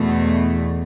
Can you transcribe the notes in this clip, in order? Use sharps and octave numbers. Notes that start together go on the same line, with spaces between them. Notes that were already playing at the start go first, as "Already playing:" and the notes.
Already playing: E2 B2 A3